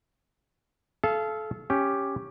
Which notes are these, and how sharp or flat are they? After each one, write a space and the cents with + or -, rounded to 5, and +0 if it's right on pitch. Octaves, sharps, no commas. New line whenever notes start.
A4 -30 F5 -30
C#4 +0 G4 +5